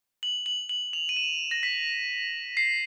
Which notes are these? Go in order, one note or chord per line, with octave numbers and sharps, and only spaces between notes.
F#7
F#7
F#7
F7
D#7
E7
A#6
B6
C7